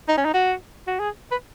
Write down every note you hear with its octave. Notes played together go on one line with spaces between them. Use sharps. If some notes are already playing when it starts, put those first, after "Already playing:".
D#4
C#4
D#4
F#4
F#4
G#4
B4